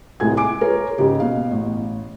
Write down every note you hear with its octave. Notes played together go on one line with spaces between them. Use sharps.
C2 A2 G#3 G#5 G#6
G#5 D6 D7
F4 G#4 A#4 C#5
G#2 C#3 G4
B2 F5
A1